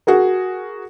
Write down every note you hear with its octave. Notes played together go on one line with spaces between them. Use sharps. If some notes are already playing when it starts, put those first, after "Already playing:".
F#4 G#4 A#4